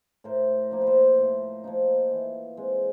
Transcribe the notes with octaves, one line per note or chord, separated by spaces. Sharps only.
A2 A#4 C5
F3 A#3 D#4
B4
A#4 C5
A2
F3 A#3 D#4
E3
G#3 C4